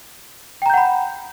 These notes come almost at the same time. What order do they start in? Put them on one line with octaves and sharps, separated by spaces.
G5 A#5 G6 F#5 B5